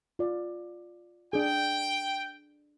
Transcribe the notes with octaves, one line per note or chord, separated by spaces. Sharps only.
F4 D5
D4 G#4 G5